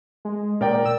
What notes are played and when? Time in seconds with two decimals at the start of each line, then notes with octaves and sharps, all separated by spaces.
0.25 G#3
0.61 A#2 A#4 D5 G5
0.86 E6